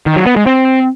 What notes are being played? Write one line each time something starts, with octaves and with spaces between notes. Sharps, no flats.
D#3
F#3
B3
G#3
C4